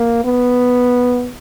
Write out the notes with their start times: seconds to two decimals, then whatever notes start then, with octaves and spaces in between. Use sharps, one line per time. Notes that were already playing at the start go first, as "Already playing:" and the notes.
Already playing: A#3
0.25 B3